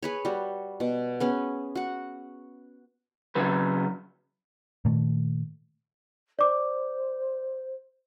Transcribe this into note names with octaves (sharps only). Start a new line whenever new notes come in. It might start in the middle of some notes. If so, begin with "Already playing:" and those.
G#4 B4 C#5
G3 F#4
B2
B3 C#4 G#4
F#4 F#5
C#3 F#3 B4
A#2 D#3 A3
C5 D5 D6